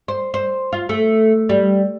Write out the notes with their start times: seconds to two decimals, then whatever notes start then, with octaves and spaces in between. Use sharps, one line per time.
0.08 C5
0.34 C5
0.73 F4
0.89 A3
1.49 G3